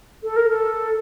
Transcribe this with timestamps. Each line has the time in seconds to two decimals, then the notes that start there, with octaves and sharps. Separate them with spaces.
0.23 A4
0.36 A#4
0.49 A4